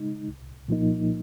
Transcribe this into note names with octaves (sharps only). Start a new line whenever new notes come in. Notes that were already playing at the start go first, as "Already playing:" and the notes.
Already playing: C#3 G#3 D#4
C2
A#2 F3 A#3 D#4